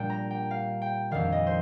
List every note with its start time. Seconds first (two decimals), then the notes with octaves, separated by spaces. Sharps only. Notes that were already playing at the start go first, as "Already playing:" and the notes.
Already playing: A#2 G3 D4 G5
0.10 A#5
0.31 G5
0.51 F5
0.82 G5
1.11 F2 D#3 G3 D4 F5
1.32 D#5
1.47 C5